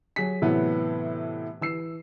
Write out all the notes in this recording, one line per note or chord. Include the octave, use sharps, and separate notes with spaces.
F#3 G#4 B6
A2 C3 E3 F#3 B3
E3 E6 C7